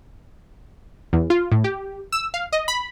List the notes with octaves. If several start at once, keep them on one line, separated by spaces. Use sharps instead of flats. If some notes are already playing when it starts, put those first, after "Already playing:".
E2
F4
A2
G4
E6
F5
D#5
B5